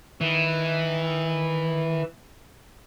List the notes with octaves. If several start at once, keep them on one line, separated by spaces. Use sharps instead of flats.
D#3 E3